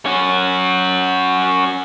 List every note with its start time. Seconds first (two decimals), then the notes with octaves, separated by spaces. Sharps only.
0.06 C#4 F#4